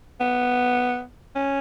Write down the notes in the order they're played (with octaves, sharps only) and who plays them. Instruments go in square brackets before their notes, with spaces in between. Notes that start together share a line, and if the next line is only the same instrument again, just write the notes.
[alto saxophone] B3
C#4